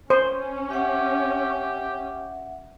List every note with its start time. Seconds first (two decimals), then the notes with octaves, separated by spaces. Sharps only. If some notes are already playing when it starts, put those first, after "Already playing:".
0.10 C#4 C5
0.71 G4 E5 F#5